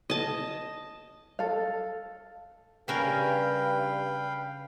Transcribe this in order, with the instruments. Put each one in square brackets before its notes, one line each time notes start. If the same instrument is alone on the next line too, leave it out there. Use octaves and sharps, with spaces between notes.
[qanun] D#5 A5
[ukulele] A4 F5
[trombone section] G2 [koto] C#3 C#4 A#4 [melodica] B4 F5 G5